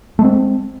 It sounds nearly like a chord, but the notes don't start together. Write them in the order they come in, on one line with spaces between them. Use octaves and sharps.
A3 G#3 C4